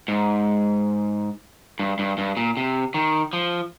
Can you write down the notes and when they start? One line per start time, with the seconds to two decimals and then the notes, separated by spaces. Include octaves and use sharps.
0.08 G#2
1.79 G2
1.99 G2
2.18 G2
2.37 A#2
2.57 C3
2.94 D#3
3.33 F3